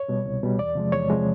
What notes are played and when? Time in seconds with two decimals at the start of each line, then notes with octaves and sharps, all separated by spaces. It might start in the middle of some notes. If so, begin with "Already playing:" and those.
Already playing: C#5
0.08 B2 G3
0.26 C2
0.43 B2 G3
0.58 E2 D5
0.75 C3 F3 G#3
0.92 E2 C#5
1.10 C3 F3 G#3